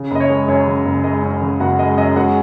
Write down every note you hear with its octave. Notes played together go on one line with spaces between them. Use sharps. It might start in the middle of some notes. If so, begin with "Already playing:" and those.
Already playing: C#3
F#1 D#5
C#5
G#3
F#2 C#5
C#3
F#1
G#3 D#5
F#2
C#3
F#1 F#4 F#5
G#3 D#5
F#2 D#5
G#3 F#4 F#5